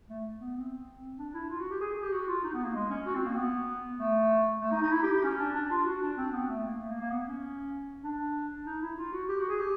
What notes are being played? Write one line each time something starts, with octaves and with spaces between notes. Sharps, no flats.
A3
B3
C4
D4
E4
F4
F#4
G4
G#4
G#4
G4
F#4
F4
D#4
B3
A#3
G#3
C#4
F#4
C4
A#3
B3
A3
A3
D#4
D#4
E4
G4
G4
C#4
D4
D4
F4
F#4
D4
C4
B3
A3
A#3
A3
A#3
A#3
B3
C#4
D4
D#4
E4
F4
F#4
G4
F#4
G#4
G4